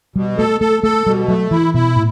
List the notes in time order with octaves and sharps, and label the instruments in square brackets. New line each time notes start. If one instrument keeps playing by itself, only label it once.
[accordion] B2 [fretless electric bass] G3
[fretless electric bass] A3 [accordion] A4
[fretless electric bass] A3 [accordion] A4
[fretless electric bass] A3 [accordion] A4
[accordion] B2 [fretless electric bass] G3
[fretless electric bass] F#3 [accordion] A3
[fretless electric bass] E3 [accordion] E4
[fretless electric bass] B2 [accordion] E4
[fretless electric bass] A2